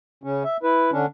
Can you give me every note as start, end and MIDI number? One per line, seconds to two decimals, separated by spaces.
0.24 0.43 49
0.24 0.43 61
0.44 0.57 76
0.63 0.91 64
0.63 0.91 71
0.92 1.06 50
0.92 1.06 61
0.92 1.06 62